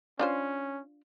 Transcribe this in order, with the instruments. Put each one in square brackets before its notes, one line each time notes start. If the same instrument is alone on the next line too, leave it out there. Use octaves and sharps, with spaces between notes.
[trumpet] C#4 [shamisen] D4 F4 C5